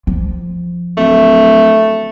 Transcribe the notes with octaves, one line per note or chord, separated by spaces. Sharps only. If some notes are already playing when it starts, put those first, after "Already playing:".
F3
D1 A3